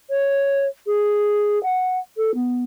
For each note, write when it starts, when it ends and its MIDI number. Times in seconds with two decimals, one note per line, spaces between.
0.10 0.65 73
0.87 1.61 68
1.63 1.97 78
2.17 2.34 69
2.34 2.64 59